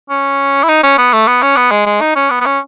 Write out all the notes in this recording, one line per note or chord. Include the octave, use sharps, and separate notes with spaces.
C#4
E4
D#4
C#4
B3
A3
B3
C#4
B3
G#3
G#3
D#4
C#4
B3
B3
C#4